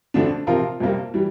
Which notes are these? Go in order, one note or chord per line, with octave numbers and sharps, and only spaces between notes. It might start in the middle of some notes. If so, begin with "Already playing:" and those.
F2 D3 A3 D4
C3 F3 C4 F4 A#4
F2 C3 G3 A#3
E3 G3